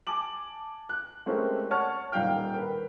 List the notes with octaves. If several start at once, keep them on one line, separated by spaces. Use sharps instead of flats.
G#5 A5 D6 F#7
F#6
G#3 A3 C4 C#4 G4 A#4
C#5 F#5 A5 C#6 F6
D#1 D#3 G3 F5 G5 F6
A#4 B4